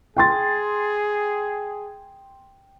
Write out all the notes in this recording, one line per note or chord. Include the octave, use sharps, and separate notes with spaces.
G#4 G5 C6 A6